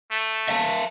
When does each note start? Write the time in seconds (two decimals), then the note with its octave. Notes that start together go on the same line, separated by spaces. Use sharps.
0.11 A3
0.48 E5 F5 A5